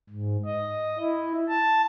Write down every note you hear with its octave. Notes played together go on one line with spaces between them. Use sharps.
G#2
D#5
E4
A5